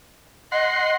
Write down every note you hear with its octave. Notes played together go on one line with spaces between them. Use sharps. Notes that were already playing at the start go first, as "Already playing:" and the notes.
D#5 F#5 C6